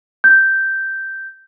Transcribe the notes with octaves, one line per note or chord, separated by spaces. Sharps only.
G6